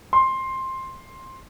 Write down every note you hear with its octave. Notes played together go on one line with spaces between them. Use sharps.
C6